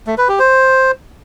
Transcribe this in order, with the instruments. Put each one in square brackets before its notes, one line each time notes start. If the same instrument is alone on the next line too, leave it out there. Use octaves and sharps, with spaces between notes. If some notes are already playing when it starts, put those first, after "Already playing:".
[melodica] A3
B4
G4
C5